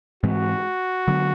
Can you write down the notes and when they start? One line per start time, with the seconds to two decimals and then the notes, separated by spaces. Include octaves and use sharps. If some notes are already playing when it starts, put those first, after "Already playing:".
0.23 G#2 E3 G#3 C4 F#4
1.08 D3 F#3 B3